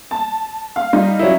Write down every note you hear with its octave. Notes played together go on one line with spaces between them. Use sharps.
A5
F5
G3 D#4 F4
F#3 C#4 E4